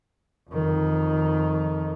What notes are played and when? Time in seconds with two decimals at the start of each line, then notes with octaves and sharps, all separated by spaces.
0.49 F2 D#3